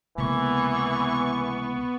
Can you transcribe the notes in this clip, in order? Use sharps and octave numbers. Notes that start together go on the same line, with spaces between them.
C#2 C3 E3 A#3 B3 C#6